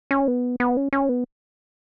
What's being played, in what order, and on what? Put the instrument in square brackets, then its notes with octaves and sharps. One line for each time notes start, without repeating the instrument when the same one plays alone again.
[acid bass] C#4
B3
B3
C#4
C#4
B3